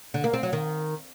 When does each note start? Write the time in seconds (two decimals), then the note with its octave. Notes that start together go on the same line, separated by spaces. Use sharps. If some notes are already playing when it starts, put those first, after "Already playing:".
0.14 D3
0.24 A#3
0.33 C4
0.43 F#3
0.53 D#3